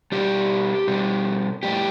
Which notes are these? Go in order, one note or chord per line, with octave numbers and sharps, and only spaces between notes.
B2 G3 G4
B2 G3
A2 G3 G4